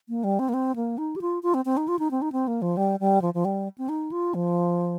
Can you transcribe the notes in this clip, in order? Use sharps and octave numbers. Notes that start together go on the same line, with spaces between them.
A#3
G3
C4
A#3
C4
A#3
D#4
G4
F4
F4
C4
C4
D#4
F4
D#4
C4
D#4
C4
A#3
F3
G3
G3
F3
F3
G3
C4
D#4
F4
F3